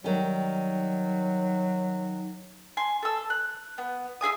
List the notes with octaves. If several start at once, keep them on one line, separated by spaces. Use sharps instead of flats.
D#3 F#3 G3
G#5 C6
A4 E6
F#6
B3
E4 G#4 G#5 D#6